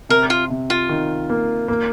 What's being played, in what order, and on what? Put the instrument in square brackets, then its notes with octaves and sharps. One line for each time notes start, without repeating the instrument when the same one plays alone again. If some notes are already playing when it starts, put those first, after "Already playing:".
[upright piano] C3 [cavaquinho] A#4
[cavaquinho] F4
[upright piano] C3
[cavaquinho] F4
[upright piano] D#3
A#3
A#3